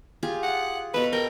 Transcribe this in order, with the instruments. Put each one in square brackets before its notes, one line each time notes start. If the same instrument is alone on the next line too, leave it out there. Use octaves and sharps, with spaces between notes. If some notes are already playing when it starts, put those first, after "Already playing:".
[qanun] F4 G4 G#4
[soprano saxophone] F#5
[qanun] B2 A4 [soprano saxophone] B4
[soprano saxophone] A#4 [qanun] G5